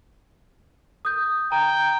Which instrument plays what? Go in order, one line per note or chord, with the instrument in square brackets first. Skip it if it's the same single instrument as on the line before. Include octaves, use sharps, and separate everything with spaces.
[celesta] D#6 G6
[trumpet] G5 [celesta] A#5